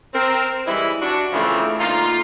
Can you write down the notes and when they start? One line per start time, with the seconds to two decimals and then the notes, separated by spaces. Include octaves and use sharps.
0.14 C4 A#4
0.66 E3 G3 G#3 E4
1.02 D4 F#4
1.33 C#3 E3 F3 A3 A#3 C4
1.79 D3 A#3 D#4 F4